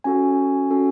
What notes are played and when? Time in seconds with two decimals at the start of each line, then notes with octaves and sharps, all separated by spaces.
0.04 C#4 F#4 A4 G#5
0.71 C#4 F#4 A4